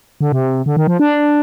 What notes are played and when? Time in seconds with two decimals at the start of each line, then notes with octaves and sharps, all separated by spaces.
0.21 D3
0.32 C3
0.66 D3
0.77 D#3
0.87 F3
0.99 D4